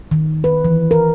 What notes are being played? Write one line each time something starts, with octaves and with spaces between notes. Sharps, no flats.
D#3
B4
E3
A#4